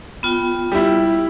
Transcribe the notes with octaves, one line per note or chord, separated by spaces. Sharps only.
B3 F4 G5
G3 E4 G4